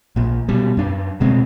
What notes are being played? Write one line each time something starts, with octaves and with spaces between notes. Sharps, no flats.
A#1 A#2
B2 G3
F#2 D4
D2 B2 G#3 C4